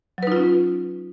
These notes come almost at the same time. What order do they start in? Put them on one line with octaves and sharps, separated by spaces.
F#3 B4 D#4 F4 C#4